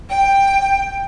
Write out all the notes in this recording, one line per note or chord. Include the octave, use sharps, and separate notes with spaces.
G5